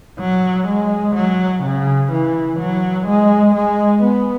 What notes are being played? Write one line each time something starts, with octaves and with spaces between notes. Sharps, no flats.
F#3
G#3
F#3
C#3
E3
F#3
G#3
G#3
B3